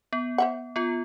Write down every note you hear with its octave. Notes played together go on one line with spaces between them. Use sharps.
B3
C5 E5 F#5
B3 F4